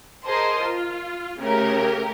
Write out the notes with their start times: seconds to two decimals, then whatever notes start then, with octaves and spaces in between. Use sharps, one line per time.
0.24 G#4 A#4 C5 D#5 A5 C6
0.61 F4
1.40 C#3 A3 G4 A#4